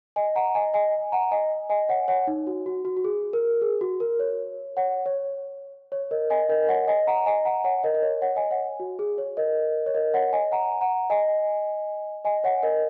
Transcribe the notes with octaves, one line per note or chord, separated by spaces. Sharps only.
D#5 G#5
F#5 A#5
D#5 G#5
D#5 G#5
F#5 A#5
D#5 G#5
D#5 G#5
C#5 F#5
C#5 F#5
D#4
F#4
F#4
F#4
F#4
G#4
A#4
G#4
F#4
A#4
C#5
C#5 F#5
C#5
C#5
A#4 D#5
D#5 G#5
A#4 D#5
C#5 F#5
D#5 G#5
F#5 A#5
D#5 G#5
F#5 A#5
C#5 F#5
A#4 D#5
D#5
C#5
C#5 F#5
D#5 G#5
C#5 F#5
F#4
G#4
C#5
A#4 D#5
C#5
A#4 D#5
C#5 F#5
D#5 G#5
F#5 A#5
F#5 A#5
D#5 G#5
D#5 G#5
C#5 F#5
A#4 D#5